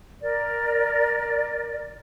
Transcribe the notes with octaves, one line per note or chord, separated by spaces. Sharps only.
A#4 D5